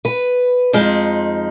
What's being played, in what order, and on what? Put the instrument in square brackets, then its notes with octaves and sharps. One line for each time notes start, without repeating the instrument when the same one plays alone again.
[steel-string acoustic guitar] B4
F2 F3 G#3 D#4